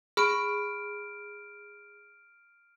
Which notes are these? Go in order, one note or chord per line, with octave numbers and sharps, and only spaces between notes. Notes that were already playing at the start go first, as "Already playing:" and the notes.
G#4 B5 F6 D7